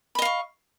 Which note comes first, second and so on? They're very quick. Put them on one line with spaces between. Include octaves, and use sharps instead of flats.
B5 D#5 F5 C#6